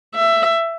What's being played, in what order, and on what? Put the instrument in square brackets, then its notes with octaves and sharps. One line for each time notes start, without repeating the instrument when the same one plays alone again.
[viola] E5